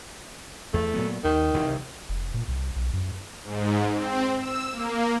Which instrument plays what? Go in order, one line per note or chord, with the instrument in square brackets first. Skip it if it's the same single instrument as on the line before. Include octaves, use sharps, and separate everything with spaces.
[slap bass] E2 [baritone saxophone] A3
[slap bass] A#2 F#3 B3
[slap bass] D#2 [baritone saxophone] D#3
[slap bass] C2 C3 E3
[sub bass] F1
A#2
C2
B1
F#2
[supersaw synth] G#2
C4
E6
A#3